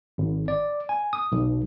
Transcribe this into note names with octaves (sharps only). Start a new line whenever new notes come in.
G#1
D5
G#5
D#6
B1